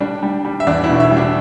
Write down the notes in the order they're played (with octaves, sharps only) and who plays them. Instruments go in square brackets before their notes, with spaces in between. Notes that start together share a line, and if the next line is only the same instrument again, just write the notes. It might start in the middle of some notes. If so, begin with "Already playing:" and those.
[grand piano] G3 D4 D5
G3
G3
E5
E2 D4 D5
E4 E5
B2
D5
E4 E5
G3
D4 D5